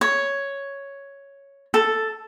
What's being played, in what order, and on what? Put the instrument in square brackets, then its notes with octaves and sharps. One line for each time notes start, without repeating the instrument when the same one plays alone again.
[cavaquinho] C#5
A4